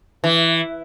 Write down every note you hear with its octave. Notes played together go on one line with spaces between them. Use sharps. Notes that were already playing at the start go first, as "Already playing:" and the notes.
E3